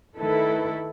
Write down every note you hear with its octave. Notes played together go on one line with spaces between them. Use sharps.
D#3 A3 E4 A4 B4